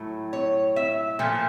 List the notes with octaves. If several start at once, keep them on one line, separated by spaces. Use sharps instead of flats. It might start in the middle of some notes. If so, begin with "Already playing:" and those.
Already playing: A2 F#3 A3
C#5
E5
A#2 F3 A3